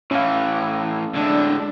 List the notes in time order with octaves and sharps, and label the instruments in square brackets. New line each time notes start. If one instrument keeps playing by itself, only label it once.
[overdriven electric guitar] A2 E3 [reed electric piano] C#4 F5
[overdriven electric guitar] A2 D3 [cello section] G#3 D4